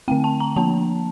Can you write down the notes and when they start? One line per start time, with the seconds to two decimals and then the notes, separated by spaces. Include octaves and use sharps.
0.08 D3 A3 C4 G5
0.24 A5
0.40 A#5
0.56 F3 A#3 D4 A5